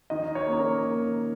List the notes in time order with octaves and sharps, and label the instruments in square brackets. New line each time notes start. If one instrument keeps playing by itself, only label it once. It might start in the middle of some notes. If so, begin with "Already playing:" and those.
[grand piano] D#3 D#5
C#5
A#3 C#4
A#4
D#3